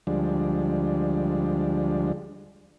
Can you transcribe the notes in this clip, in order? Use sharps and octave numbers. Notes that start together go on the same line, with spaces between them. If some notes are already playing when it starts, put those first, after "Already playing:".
D2 F3 G3 G#3 D4